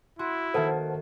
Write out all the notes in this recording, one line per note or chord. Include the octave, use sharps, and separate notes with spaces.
E4 F#4 C6
D#3 A#3 A4 B4 C5 E5 F#5 A5